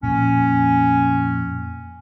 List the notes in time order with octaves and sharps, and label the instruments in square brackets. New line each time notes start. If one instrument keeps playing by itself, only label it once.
[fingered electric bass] F2 A#2 [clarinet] C#4